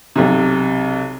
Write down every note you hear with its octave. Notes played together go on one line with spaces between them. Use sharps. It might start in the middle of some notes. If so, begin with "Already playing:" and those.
B1 C3